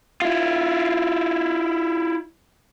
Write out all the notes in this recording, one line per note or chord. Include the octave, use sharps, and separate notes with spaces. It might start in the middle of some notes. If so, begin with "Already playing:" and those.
E4 F4